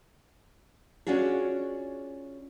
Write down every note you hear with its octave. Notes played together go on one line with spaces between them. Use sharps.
C#4 D4 F4 F#4 G#4